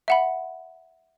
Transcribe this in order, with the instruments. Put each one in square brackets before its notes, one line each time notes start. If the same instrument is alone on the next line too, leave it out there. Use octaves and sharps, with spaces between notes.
[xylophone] E5 F#5 B5